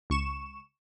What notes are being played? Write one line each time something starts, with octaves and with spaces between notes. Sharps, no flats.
C#2 C#6 E7